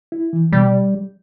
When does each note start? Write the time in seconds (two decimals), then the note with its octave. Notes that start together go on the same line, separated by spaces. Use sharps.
0.12 E4
0.33 E3
0.52 B2 G3